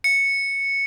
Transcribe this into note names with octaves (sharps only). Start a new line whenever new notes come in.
C#7